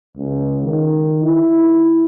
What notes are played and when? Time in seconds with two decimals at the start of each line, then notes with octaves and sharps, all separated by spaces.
0.17 C#2
0.62 D#3
1.23 E4